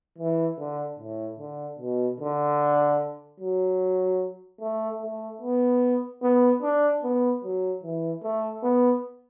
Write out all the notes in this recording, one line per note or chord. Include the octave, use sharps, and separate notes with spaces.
E3
D3
A2
D3
B2
D3
F#3
A3
A3
B3
B3
D4
B3
F#3
E3
A3
B3